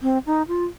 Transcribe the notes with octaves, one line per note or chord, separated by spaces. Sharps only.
C4
D#4
F4